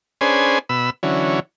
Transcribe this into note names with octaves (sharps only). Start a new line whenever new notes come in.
C#4 D4 G#4 B4 C5 G#5
B2 B5 E6
D3 E3 F#3 C#4